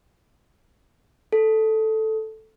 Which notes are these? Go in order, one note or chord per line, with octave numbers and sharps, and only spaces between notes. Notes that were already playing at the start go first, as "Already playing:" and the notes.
A4